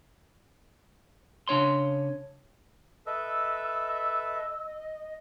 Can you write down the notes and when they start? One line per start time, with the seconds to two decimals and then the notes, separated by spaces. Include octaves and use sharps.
1.48 C#3 D4 C#5 C6
3.06 A4 B4 D#5 E5 E6